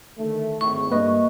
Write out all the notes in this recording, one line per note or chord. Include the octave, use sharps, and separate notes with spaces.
D3 D#3 A3
G#1 A2 C#6
G2 A3 A#3 B4 D#5